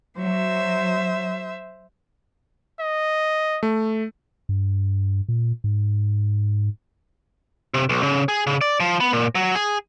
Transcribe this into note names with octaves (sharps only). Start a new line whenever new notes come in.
F#3 C5 E5
D#5
A3
G2
A#2
G#2
C3
B1
C#3
G#4
C#3
D5
F3
B3
A#2
F#3
G#4